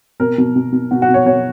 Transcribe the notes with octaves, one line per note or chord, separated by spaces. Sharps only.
B2 A#4
B2
B2
B2
B2 F#4
F#4
B2
C#5
B2 C#5